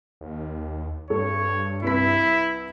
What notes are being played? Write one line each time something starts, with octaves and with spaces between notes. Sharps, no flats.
D#2
G2 A4 C#5
C2 E4 B4 B6